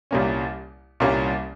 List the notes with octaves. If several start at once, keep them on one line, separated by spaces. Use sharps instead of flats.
C2 A#2 G3 A#3 C#4
C2 A#2 G3 A#3 C#4